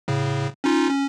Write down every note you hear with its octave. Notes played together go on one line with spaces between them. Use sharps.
A2 C#3
C#4 D#4 F4
C#4